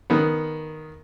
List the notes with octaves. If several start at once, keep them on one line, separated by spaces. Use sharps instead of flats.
D#3 B3